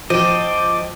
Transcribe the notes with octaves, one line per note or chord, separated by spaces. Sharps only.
F3 C5 D#5 G5 D6